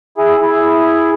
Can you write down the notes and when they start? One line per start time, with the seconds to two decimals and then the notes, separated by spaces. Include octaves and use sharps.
0.18 E4 G#4
0.40 E4 G#4